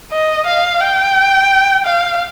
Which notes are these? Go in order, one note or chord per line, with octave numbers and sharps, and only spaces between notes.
D#5
F5
G5
F5